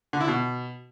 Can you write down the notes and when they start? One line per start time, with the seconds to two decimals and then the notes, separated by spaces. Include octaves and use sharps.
0.13 D3
0.20 E4
0.28 B2